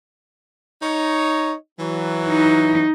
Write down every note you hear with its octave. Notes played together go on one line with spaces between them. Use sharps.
D#4 C#5
E3 F#3
D#4